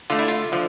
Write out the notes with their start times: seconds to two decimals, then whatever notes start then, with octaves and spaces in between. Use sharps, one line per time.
0.10 D3 A3 F4
0.19 E4
0.28 F4
0.52 D3 F3